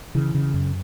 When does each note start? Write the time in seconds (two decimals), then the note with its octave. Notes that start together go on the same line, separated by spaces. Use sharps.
0.15 C#3 E3
0.35 C#3
0.54 F#2